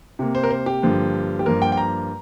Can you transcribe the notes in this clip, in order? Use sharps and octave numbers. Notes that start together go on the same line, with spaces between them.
C3 A#3
C5
A#4
C5
G4
G2 D3 F3 A#3
G4
G2 F3 A#3 A#4
G5
G5
A#5